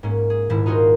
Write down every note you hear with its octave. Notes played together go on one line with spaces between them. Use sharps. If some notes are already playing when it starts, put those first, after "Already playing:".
G#2 A#3 C#4
G#4
D#1 G#2 E4
D#4 F4 F#4 G#4 A#4 C5